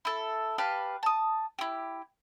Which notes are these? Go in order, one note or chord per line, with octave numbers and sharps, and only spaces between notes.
E4 A4
G4 B4 F5 A5
A5 D#6
E4 G4